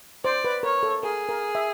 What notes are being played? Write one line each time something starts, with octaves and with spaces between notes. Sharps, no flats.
C5 D5
B4
A#4 C#5
A4
G#4 A#4
A#4
E5